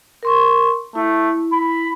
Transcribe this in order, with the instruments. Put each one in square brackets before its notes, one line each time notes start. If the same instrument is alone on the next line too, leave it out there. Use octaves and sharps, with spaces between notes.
[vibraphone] A#4 C6 C#6
[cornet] A3 [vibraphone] E4
[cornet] B5